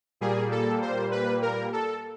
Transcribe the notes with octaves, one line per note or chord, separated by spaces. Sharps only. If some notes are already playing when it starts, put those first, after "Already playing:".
A#2 G3 A#3 G#4
A4
C5
B4
A#4
A4